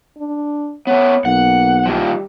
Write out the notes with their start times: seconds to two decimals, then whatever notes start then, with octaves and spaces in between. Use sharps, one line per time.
0.18 D4
0.87 A3 B3 C#5
1.25 B1 A#3 F#5
1.85 A#2 D#3 F3 G3